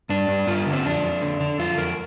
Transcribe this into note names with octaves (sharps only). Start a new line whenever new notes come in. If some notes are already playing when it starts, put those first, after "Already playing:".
G2 D4
G2
G2 F4
D3
C4
F2 D4
F2
D3
D3
F2 F4
F2 A#4